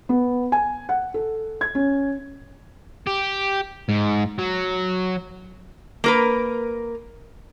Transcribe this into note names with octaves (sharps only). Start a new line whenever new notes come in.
B3
G#5
F#5
A4
G#6
C#4
G4
G#2
F#3
A#3 A#4 B4